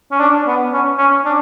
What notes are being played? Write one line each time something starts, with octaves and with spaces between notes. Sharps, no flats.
C#4
D4
B3
C#4
C#4
D4